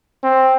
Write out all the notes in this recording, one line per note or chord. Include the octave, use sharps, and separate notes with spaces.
C4